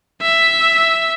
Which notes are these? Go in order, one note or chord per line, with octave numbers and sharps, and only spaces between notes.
E5